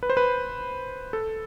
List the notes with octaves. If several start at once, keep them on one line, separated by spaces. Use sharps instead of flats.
B4
C5
B4
A4